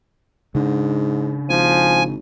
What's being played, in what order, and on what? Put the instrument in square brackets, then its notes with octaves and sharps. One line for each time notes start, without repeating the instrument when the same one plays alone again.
[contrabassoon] G#2 [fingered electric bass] C#3 D4
[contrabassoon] G#1 [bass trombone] F3 [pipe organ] G#5